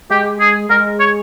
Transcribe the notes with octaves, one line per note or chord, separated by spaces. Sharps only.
G#3 G4
G#4
G#3 A#4
C#5